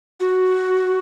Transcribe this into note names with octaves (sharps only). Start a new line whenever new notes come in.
F#4